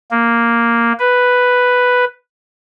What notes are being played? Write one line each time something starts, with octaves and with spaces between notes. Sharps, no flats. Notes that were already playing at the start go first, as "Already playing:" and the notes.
A#3
B4